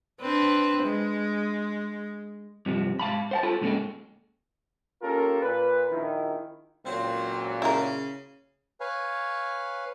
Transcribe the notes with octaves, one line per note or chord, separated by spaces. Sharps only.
C4 D4 B4
G#3
G2 C3 F3
G#2 F5 A5 B5
C5 F#5 A5
F4 A4 B5
C#2 G#2 C#3 A#3 G#4 A4
A#3 C#4 F4 G4 A4 A#4
A#2 B4
A#1 D#3 E4
C#2 A#2 F#3 C4
C#3 E4 A#4
B4 C#5 F5 G#5